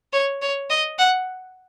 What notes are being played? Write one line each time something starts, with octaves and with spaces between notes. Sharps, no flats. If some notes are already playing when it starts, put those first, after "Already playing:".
C#5
C#5
D#5
F#5